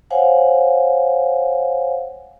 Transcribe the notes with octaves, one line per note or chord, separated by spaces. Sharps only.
C5 C#5 F5 F#5 G#5